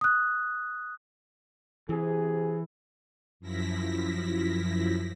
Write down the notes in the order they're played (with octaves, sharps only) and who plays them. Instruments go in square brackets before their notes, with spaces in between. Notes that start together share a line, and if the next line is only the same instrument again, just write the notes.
[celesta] D#6 F#6
[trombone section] C3 G#4 [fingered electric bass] E3
[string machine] F#2 F3 E4 A#6 B6